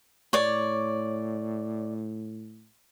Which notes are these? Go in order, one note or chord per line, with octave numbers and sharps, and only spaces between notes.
A2 C#5 D5